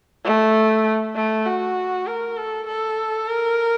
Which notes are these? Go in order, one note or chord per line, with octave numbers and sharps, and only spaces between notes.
A3
A3
F#4
A#4
A4
A4
A#4